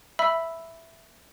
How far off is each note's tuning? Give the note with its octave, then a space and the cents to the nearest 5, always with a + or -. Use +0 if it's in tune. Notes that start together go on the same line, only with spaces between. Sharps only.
E5 +0 B5 +0 E6 +0